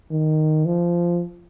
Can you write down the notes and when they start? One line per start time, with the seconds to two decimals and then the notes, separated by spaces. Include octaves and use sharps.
0.11 D#3
0.66 F3